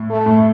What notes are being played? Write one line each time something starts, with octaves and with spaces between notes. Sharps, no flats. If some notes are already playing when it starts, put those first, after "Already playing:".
Already playing: A2
A3
A2